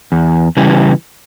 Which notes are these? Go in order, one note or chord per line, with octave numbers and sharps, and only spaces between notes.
E2
C#3 E3 G3